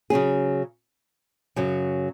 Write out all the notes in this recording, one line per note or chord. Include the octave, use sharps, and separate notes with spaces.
C#3 F#3 C#4 G#4
F#2 C#3 F#3